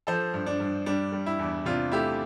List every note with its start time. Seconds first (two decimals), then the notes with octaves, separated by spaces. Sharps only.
0.07 F3 A4 C5
0.34 G2
0.46 D4
0.60 G2
0.86 G3 D4
1.13 G3
1.26 E4
1.39 E2
1.66 C3 D4 F4
1.92 A3 E4 G4